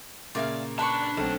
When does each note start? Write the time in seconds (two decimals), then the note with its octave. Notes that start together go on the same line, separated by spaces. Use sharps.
0.35 A#2 C#3 A#3 D5 E5 F5
0.79 D4 B4 A5 B5 C#6
1.17 B1 A3 C4